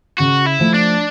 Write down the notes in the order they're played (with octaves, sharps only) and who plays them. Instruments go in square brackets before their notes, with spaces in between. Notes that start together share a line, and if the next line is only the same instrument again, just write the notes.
[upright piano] C#3 [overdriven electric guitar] F#4
[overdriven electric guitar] E4
[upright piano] F3 A3
[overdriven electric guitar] D4